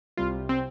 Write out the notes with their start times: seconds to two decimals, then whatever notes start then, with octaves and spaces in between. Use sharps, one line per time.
0.17 C2 C3 G3 F4
0.49 C4